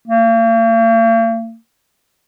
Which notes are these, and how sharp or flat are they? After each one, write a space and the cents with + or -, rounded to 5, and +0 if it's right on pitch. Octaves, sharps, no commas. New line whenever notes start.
A#3 -45